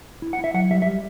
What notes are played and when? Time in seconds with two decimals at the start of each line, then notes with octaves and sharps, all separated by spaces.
0.22 E4
0.33 F#5
0.39 E4
0.44 E5
0.54 F#3 F#5
0.70 G3 E5
0.82 E5
0.86 G3